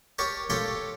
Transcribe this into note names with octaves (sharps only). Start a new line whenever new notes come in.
G4 A#4 C#5 A5 C#6
G4 A4 C#5 F5 A5 C6